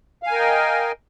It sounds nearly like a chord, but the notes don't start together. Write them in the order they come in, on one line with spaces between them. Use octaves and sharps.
F5 G#5 A#4 G5 D#5